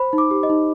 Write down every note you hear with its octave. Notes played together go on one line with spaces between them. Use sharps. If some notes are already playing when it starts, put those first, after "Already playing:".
Already playing: C5 B5
D#4
D6
G4
D#5
D#4